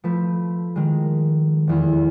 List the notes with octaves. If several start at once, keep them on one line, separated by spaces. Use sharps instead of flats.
F3 A3 B4
D#3 G#3
F1 E2